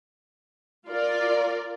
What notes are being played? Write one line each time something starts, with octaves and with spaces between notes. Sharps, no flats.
F4 A#4 D5